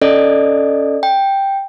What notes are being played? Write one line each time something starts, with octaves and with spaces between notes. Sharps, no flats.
C#4 A4 D5 D#5
G5